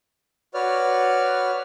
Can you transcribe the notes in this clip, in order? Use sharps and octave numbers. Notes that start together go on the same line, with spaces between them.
F#4 B4 C#5 D5 F6